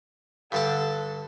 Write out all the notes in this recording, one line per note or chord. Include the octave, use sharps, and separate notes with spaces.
G2 D3 A4 A5